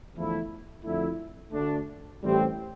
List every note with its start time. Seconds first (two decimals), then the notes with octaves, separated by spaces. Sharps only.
0.15 E2 D3 F3 A3 E4
0.84 F2 D3 A3 E4
1.52 D2 D3 A3 D4
2.22 A1 A2 G3 C4 G4